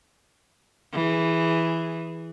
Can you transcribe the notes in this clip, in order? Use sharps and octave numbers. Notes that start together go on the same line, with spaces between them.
E3 G#4